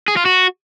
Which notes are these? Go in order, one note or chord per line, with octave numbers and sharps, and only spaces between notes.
G#4
F4
F#4